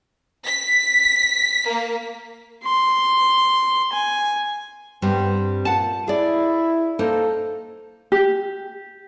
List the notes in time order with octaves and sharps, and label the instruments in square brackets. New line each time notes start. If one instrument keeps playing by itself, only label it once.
[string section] B6
A#3
[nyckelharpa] C6
G#5
[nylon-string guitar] G2 G3 C4 [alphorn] B3
[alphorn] A#2 [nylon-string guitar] F#5 A5
[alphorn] E4 [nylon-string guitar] G#4 D5
[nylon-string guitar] A#3 D#4 C5 [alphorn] A4
[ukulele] G4